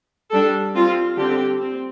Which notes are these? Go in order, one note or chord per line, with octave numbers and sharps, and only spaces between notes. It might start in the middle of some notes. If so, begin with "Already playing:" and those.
G3 D4 A4
G3 C4 F4
D3 G3 C4 G4
C4